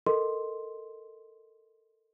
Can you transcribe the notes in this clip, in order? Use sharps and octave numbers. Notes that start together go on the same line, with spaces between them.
A4 A#4 D#5 C6